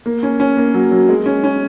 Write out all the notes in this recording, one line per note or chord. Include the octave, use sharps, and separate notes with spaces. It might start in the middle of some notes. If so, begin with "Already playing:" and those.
A#3
C#4
C#4
A#3
F#3
F#3
G#3
C#4
C#4